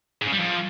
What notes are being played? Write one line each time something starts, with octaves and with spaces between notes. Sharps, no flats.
G#2
C#3
G3
F2